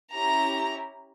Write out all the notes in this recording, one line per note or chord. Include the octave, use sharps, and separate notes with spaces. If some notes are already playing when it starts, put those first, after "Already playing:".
C#4 E4 G4 A#5